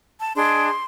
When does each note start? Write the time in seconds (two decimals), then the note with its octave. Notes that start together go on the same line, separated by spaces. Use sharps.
0.20 A5
0.36 D4 G#4 D#5 C6